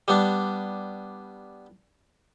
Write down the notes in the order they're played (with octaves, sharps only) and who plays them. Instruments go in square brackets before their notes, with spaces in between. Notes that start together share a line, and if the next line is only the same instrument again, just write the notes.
[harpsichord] G3 B3 D4